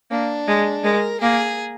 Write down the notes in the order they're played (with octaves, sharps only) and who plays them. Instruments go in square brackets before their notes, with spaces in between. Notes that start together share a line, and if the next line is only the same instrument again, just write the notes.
[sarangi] A#3 [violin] D4
[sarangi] G#3
[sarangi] G#3 [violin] A#4
[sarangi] A#3 [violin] G#4